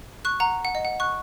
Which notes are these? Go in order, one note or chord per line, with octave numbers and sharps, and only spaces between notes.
C#6 F#6
F#5 A#5
F#5
D#5
F#5
C#6 F#6